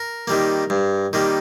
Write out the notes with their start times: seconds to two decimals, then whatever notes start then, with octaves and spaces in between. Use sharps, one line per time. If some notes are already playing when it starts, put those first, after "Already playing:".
Already playing: A#4
0.28 D#3 G3 A#3
0.70 G2
1.13 D#3 G3 A#3